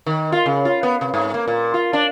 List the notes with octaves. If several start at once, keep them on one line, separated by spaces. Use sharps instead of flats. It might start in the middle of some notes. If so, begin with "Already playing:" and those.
D#3
F4
C#3
F4
B3
C3
G#2
A#3
A#2
F4
D4